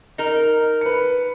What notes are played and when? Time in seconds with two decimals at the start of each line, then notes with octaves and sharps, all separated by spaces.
0.18 D#4 A#4
0.81 B4 C#7